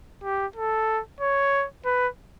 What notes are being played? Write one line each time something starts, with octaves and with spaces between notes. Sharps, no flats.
G4
A4
C#5
B4